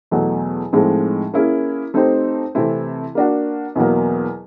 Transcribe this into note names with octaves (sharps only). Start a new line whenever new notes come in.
E2 B2 F#3 A3
A2 F3 G#3 C4 D#4
A#3 C#4 E4 G#4
A3 C4 D#4 G4 C5
C3 E3 A3 C4 E4
A#3 D4 F#4
E2 B2 F#3 A#3